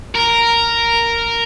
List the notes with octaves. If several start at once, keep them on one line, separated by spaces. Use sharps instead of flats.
A#4